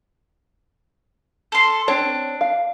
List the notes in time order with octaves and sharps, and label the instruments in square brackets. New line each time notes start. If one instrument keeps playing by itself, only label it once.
[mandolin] A4 C6
[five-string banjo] C4 C#5 [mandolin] D4
[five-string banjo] F5